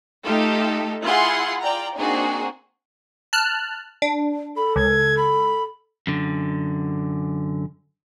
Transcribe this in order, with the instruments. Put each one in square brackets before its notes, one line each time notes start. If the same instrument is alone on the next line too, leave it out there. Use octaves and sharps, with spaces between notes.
[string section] A3 D#4 F4 G4 A4
E4 F4 G#4 F#5 C6
F4 D5 G5 A#5
A#3 C4 D4 D#4 F#4 G#4
[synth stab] A5 F6 F#6
D4
[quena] A4 [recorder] B5
[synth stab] C#2 [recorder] G#6
[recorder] B5
[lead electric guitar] F#2 D3